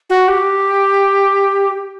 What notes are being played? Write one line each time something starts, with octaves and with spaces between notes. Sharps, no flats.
F#4
G4